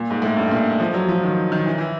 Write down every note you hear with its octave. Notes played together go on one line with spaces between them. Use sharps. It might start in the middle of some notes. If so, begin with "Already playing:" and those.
Already playing: A#2
G#2
A2
G2
A#2
F3
F#3
F3
D#3
D#3
E3
E3